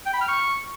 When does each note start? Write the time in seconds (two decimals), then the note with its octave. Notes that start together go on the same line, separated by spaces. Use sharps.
0.06 G5
0.14 B5
0.21 F6
0.29 C#6